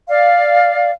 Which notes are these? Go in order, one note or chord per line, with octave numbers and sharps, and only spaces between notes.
D5 F5